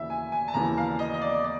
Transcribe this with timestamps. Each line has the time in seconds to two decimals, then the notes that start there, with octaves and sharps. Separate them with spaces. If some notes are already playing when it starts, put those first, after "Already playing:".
Already playing: D#2 C#3 E3 E5
0.10 G#5
0.32 G#5
0.48 A5
0.54 D#2 C#3 E3 A#5
0.78 F5
0.99 D#5
1.14 D#5
1.22 D5
1.44 D5